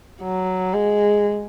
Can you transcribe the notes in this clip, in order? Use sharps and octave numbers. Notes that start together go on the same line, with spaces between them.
F#3
G#3